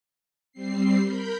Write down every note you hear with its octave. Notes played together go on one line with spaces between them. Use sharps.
G3 C4 C7
A#4 B5 G6